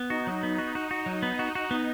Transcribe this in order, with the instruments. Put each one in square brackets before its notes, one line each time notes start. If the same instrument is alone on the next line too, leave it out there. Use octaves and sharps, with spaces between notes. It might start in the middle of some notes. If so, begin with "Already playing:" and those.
Already playing: [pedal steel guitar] B3
[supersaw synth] D#4 [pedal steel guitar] F#4
[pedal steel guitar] F#3
B3
F#4
[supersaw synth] D#4 [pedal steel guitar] F#4
[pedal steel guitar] F#4
F#3
B3
F#4
F#4
B3